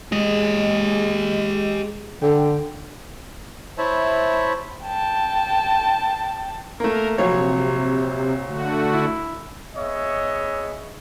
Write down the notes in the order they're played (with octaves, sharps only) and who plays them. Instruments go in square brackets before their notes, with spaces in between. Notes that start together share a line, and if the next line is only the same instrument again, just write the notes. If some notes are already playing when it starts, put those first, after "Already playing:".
[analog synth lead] G#3 [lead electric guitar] G4 D#5
[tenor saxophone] D3 [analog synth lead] G5
[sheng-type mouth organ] E4 C5 C#5 E5 A5 B5
[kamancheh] G5 A5
[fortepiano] A3 A#3 [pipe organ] A#4
[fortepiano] A#1 F#3 C#5 [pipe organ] C3
[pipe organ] D3 A3 F#4
[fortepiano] E4
[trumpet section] B3 G#4 C#5 D#5 E5